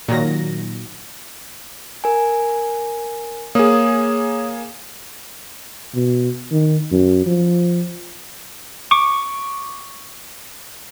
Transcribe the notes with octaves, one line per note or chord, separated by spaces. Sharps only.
A#2 D#3 F#3 A#6
A#4 G#5
A#3 G#4 C#5 D#6
B2
D#3
F#2
F3
C#6 D6